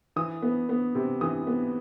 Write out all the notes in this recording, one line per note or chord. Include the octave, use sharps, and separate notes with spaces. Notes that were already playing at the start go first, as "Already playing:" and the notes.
E3 D#6
B3
B3
C3
E3 D#6
B3